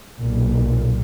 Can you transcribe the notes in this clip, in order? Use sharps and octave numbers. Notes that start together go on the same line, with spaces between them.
B1 A#2